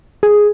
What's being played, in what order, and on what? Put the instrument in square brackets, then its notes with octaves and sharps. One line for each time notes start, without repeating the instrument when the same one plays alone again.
[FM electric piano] G#4